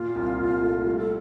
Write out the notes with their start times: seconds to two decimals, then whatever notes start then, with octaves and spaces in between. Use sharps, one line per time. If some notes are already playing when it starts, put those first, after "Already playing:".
Already playing: A#2 F4
0.15 C2
0.39 C2
0.62 A3
0.85 G3
0.98 A4